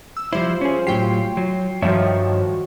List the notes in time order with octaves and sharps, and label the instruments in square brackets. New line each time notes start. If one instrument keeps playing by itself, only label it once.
[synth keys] E6
[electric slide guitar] F3 G3 E4 [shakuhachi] F4 [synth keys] C5
[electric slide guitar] C#4 G#4
[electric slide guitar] A2 F#3 G4 [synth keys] G5 C7
[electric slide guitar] F#3
[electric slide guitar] G2 C#5 E5 [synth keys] D#3 F3 G3 [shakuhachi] F#4